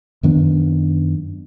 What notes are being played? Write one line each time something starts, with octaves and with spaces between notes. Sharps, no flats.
F#2 D#3 B3 D4